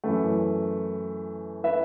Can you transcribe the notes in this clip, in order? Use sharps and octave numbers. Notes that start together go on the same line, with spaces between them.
F#2 E3 A3
B4 E5